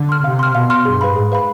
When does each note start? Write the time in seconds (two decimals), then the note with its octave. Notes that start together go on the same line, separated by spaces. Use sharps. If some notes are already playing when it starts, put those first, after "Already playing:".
Already playing: D3
0.09 C6 F6
0.24 C3 F5
0.39 C6 F6
0.55 B2 F5
0.70 C6 F6
0.85 G2 G#4
1.01 B4 F5 B5
1.16 G#2 G#4
1.32 B4 F5 B5